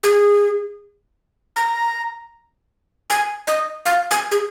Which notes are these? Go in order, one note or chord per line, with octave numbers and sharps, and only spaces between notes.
G#4
A#5
G#5
D#5
F5
G#5
G#4